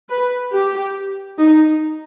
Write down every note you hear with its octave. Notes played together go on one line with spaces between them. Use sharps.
B4
G4
D#4